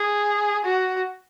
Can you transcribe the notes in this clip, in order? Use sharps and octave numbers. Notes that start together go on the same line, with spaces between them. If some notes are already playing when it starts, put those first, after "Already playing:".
Already playing: G#4
F#4